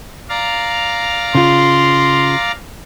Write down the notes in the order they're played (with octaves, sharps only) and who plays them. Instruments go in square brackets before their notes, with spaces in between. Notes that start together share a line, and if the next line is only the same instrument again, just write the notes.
[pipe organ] D5 F5 A#5
[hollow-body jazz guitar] C#3 F4 [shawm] C6